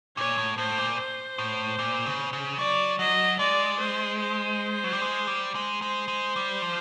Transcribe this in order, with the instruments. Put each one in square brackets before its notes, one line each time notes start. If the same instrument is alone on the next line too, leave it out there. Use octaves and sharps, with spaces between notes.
[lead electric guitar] A#2 [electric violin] C#5
[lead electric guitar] A2
[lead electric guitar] A2 [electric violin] C5
[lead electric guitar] A#2
[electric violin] C5
[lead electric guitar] A2
A#2
C#3
C#3
[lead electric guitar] F#3 [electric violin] D5
[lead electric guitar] F#3 [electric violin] D#5
[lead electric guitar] G#3 [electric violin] D5
[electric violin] C5
C5
[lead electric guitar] F#3
G3
G#3
G3
G#3
[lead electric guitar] G#3 [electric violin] C5
[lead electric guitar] G#3
G3
F3